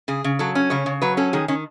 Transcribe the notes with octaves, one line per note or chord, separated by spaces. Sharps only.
C#3 G#4
C#3
F#3 A4
C#4
C#3 C#5
C#3
F#3 B4
C#4 A4
D#3 G#4
D#3 C#4